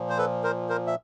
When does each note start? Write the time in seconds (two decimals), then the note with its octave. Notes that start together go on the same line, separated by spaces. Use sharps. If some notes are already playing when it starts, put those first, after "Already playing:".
Already playing: A#2 F3
0.09 C5
0.18 A4 B4
0.43 A#4 C5
0.69 A#4 C5
0.87 E5